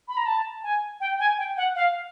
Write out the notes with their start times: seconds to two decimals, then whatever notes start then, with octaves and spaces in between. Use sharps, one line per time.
0.08 B5
0.17 A#5
0.26 A5
0.63 G#5
1.00 G5
1.20 G#5
1.38 G5
1.57 F#5
1.75 F5